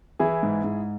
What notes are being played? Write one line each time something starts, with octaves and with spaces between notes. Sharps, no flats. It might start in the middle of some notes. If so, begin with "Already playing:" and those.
E3 E4 G#4
G#2
G#2